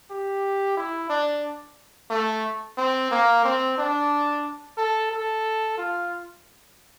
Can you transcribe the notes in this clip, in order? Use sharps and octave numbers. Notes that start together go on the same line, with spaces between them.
G4
E4
D4
A3
C4
A#3
C4
D4
A4
A4
F4